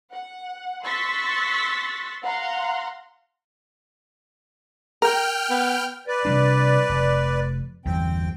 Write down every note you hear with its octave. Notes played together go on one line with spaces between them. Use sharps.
F#5
C6 C#6 E6 F#6 A6 B6
F5 F#5 A#5 C6
A#4 G5 F6
B3
B4 D5
C3 G3 D4
F1
G1 E2 G3 C4 G5